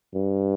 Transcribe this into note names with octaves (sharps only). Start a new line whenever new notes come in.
G2